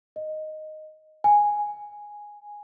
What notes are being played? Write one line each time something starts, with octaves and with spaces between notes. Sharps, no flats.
D#5
G#5